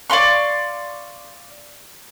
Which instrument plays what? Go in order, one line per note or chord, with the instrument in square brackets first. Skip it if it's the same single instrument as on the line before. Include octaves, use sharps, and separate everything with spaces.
[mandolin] D5 F5 C6 C#6